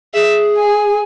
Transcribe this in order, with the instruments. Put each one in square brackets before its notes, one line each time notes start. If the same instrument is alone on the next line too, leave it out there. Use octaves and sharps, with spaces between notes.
[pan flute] G#4 [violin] E5
[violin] G#5